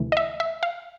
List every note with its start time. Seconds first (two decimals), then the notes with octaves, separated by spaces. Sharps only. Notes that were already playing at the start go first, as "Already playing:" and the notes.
Already playing: D2 C3 E3 A3
0.12 D#5
0.17 E5
0.40 E5
0.63 F5